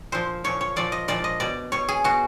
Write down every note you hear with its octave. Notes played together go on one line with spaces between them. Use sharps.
A#2 F3 C5
A#2 F3 C#5
C#5
A#2 F3 D5
D#5
A#2 F3 D5
D#5
B2 D5
B2 C#5
G#4
B2 F#4